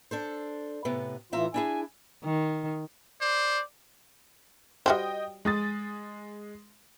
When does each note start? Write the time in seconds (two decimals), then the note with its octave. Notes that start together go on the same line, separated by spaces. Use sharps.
0.11 D4 A4 C5
0.85 A2 C3 B3
1.33 A2 E3 F4 E5 A#5
1.54 D4 E4 G#4 G#5
2.24 D#3
3.21 C5 D5
4.86 G3 F#4 C5 D#5 G5
5.45 G#3 D#6 A6